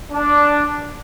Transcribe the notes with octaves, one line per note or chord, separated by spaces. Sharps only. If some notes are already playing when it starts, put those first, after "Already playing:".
D4